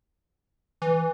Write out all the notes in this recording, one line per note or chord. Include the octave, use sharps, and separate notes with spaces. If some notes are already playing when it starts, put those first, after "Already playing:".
E3